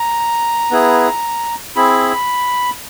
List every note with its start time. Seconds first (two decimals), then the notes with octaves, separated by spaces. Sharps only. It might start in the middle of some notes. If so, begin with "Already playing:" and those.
Already playing: A#5
0.71 B3 E4 G#4
1.76 C4 E4 G#4 B5